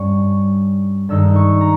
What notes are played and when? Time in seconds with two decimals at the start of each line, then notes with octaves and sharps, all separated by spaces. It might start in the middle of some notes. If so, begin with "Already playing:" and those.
Already playing: G2 G3 C#4 C#6
1.09 G2 D#3 G#3 D#4 E6
1.36 C#6
1.61 A#5